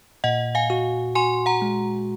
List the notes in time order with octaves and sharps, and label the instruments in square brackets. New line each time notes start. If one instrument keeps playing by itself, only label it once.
[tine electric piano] A#2 [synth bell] D#5 F#5
[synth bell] F5 G#5
[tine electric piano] F#4
[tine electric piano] F#4 [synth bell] G#5 C6
[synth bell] F#5 A#5
[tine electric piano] G#3